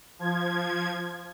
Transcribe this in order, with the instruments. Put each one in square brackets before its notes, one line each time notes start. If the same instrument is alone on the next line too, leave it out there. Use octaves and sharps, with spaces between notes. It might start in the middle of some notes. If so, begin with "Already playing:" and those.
[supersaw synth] F3 G#6